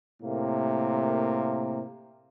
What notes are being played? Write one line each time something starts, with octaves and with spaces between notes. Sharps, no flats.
A2 C3 A#3